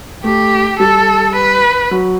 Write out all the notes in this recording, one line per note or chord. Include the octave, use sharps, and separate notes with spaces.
A3 G4
G3 A4
B4
F#3